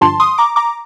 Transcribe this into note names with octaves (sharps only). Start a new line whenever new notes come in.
G2 D3 F3 A5 C6
C6 D#6
A#5 D6
A#5 D6